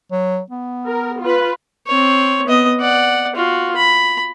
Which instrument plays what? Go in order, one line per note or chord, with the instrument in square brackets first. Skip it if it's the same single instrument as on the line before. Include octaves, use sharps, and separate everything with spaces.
[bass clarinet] F#3
B3
[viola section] A#4
F4 B4
[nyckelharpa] C4 C#5
B3 D#5
D5 F#5
F4 F#4
B5